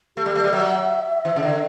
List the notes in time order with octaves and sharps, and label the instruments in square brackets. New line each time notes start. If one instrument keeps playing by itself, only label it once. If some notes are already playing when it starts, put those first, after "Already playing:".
[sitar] A3 [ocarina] G4
[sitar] G3
A3
G3
[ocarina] D5
[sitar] F#3 [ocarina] E5
[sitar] E3
C#3
D3